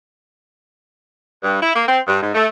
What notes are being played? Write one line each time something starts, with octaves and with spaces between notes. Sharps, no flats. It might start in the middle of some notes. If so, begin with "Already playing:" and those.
G2
E4
A#3
C4
G2
G#2
A3